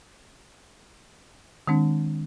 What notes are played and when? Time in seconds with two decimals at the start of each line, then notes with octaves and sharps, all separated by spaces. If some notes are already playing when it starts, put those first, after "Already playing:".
1.67 D#3 G#3 C4 D4